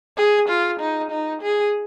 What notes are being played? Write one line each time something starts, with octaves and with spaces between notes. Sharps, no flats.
G#4
F4
D#4
D#4
G#4